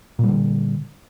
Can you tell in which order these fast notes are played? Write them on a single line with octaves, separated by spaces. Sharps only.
A#2 G3 D3